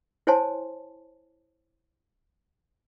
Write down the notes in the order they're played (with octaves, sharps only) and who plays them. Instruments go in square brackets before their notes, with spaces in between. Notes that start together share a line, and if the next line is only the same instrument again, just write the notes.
[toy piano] E4 C5 C#5 G#5 A5 C6